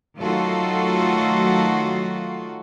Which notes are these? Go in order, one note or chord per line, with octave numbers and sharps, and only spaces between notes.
D#3 F#3 A3 F4 F#4 A4